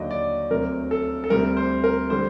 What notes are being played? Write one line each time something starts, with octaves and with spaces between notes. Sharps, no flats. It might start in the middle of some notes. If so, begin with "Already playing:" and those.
Already playing: D#2 D3 F#3 D5 D#5
D5
D2 C3 F#3 A#4
A4
A4
D2 C3 G3 A#4
C5
A#4
D3 G3 C5